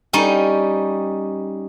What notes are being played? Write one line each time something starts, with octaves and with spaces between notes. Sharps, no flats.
G3 C#4 D#4